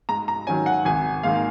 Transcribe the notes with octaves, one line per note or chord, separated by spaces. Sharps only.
G#2 A#5
A#5
D#3 F#3 C#4 G#5
F#5
G#1 G#5
G#2 D#3 A#3 F5